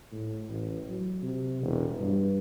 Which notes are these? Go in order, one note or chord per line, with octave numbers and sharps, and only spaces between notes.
A2
A1
F#3
C3
E1
G2